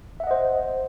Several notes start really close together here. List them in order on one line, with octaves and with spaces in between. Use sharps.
E5 F#5 D#5 C5